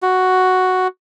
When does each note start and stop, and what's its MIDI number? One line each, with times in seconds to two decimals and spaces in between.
0.02 0.88 66